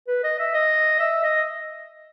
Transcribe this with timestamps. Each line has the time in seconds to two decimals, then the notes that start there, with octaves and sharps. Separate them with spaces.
0.08 B4
0.24 D#5
0.39 E5
0.53 D#5
0.99 E5
1.23 D#5